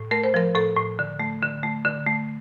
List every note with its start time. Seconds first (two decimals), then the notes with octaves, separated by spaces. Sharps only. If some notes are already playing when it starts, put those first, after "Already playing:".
Already playing: A2
0.11 A3 A#4
0.24 C5
0.34 F3 A#4
0.54 A2 A4
0.76 A2
0.99 D3
1.20 A3
1.42 D3
1.63 A3
1.85 D3
2.06 A3